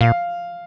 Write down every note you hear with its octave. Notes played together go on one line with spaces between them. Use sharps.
A#2 F5